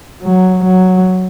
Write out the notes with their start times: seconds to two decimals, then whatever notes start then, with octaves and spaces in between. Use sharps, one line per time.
0.23 F#3
0.64 F#3